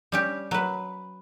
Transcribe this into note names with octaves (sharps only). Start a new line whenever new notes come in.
G3 C#4 G4
F#3 B4